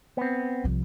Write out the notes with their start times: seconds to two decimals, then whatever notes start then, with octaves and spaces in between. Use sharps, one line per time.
0.17 B3 C4
0.64 C2 F3